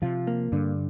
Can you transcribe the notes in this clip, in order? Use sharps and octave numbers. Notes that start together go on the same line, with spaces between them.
C3 F3 F4
A#3
G2 D3